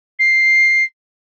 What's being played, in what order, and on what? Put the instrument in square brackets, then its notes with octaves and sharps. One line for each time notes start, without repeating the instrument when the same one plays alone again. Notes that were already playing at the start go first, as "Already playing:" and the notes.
[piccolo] C7